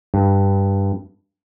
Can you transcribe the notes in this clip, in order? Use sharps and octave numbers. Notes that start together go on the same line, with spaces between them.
G2